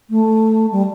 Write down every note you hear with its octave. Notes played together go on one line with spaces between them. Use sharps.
A3
G3